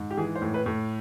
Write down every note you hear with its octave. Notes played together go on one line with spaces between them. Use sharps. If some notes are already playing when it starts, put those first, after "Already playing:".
Already playing: G#2
G4
E3 G#4
C5
A2
B4
A2